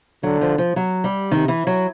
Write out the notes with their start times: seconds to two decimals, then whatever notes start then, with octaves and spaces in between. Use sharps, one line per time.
0.23 D3 F#3
0.41 F3
0.58 F3
0.76 F#3
1.04 G3
1.32 C3 D#3
1.48 E3
1.67 F#3